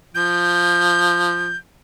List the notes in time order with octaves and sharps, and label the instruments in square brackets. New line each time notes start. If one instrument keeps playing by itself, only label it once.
[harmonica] F3 [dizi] G6